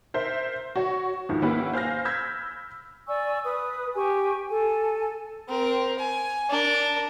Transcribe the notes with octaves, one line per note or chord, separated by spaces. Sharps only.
A#4 C5 E5
F#4 C#5
D2 G#2 D#3 F3
A#3 C#4 E4 G4 B4 F#5
C5 F5 G#5 F6 A#6
B5 E6 G6 G#6 B6
D5 G#5 C#6 E6
B4 D#6
G4 G#5 C#6
A4 G#5
C4 A#4
G#5
D4 A#4